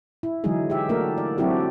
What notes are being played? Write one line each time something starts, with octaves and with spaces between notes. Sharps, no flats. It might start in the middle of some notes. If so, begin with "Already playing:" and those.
E4
D3 E3 F#3 G#3 D#4 G#4
G4 E5
A3 A#3 D4 F#4 A#4
D5
F#3 C4 D4 E4 F#4 G4